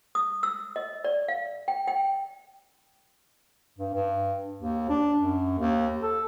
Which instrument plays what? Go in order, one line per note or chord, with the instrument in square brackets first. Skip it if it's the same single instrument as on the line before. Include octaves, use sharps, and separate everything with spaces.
[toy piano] D#6
E6
D#5
D5
F5
G5
G5
[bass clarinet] G2
G2
D#2
D4
F#2
D#2
A4